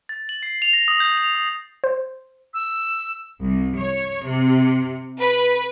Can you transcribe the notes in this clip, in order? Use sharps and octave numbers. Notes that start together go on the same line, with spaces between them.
A6
F#7
C7
F7
A#6
D#6
G6
F7
D#6
C5
E6
C2
C#5
C3
B4